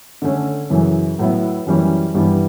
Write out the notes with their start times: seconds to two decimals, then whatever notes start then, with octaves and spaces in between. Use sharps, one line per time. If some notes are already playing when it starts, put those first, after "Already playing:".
0.22 D3 A3 C#4
0.70 F#2 C#3 E3
1.19 A2 F#3 B3 E4
1.66 F#2 E3 G3 C#4
2.14 G2 E3 G3 B3